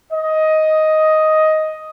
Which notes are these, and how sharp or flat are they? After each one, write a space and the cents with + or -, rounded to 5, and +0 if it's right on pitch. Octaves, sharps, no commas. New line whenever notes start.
D#5 +10